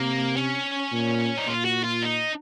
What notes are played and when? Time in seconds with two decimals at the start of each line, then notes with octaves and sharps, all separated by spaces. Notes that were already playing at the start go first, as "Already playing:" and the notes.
Already playing: C3 A#3
0.36 C#4
0.92 A#2
1.38 D#4
1.47 A#2 F4
1.65 F#4
1.84 F4
2.03 D#4